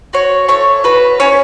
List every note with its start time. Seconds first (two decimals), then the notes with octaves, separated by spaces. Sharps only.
0.13 F#4 C#5
0.48 A3 C#5
0.84 F#4 B4
1.20 C#4 C#5